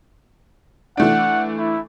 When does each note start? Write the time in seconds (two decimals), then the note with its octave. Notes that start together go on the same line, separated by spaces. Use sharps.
0.97 E3 A3 D4 F#5
1.57 E4